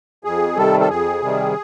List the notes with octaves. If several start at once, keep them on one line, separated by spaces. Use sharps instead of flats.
F2 G#4
C3 D#3 G3 A4
A4
F2 G#4
C3 D#3 G3